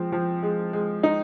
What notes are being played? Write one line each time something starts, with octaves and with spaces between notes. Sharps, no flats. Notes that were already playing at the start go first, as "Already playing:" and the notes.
Already playing: F3 G#3 C4
F3
G#3
G#3
D#4